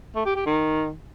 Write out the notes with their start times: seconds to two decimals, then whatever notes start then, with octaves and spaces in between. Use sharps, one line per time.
0.15 A3
0.26 G4
0.36 G4
0.46 D#3